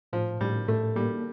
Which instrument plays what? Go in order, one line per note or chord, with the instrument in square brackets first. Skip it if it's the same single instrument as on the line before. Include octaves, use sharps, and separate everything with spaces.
[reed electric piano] A2 [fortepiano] F3
[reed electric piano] A2 [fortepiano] G3
[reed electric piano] A2 [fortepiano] A3
[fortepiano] G3 [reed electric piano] A#3